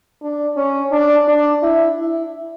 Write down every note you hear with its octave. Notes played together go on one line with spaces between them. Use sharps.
D4
C#4
D4
D4
E4
E4